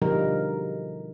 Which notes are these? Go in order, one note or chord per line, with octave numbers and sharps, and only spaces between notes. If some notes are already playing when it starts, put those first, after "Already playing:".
B2 D3 F3 G3 D#4 A#4